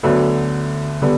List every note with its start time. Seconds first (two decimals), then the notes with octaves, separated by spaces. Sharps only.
0.03 D2 D3 F#3 B3
1.02 D3 G3 B3